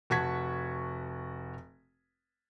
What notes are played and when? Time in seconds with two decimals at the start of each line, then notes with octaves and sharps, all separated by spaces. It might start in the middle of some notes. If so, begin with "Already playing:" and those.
0.10 F1 F#4 A5 C#6 G#6 B6